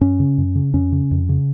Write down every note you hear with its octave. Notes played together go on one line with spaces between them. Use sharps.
F#2 C#4
C#3
F#2
C#3
F2 C#4
C#3
F2
C#3